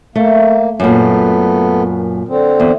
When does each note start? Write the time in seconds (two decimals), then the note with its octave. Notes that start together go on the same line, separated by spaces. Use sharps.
0.16 A3 A#3
0.80 F#2 A#2 A3 B3
2.28 D3 C4
2.60 E2